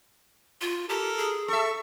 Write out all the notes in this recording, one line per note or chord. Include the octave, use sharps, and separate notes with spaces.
F4
G4 A4 A#4
G#4
A4 E5 C#6